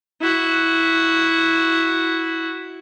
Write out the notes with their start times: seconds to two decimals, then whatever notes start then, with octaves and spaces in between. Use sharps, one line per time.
0.21 E4 F#4